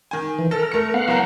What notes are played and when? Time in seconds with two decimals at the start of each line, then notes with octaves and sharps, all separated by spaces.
0.11 D#3 G#5
0.39 E3
0.51 A4 A#4
0.72 A3 C#7
0.94 B3 F5 F#5
1.08 F#1 A#4